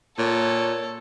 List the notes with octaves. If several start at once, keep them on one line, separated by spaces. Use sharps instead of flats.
A#2 A4 C#5